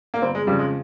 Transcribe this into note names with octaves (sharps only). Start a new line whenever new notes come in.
A#3
G1 C4
G#3
F2 C#3 G3
G#3